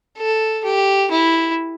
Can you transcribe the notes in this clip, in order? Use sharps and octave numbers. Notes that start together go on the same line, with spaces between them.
A4
G4
E4